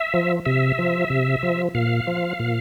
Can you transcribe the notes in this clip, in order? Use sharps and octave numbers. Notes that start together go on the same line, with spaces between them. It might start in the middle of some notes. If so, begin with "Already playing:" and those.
Already playing: E5
F3
C3 E5
F3
C3
F3
A#2 F5
F3
A#2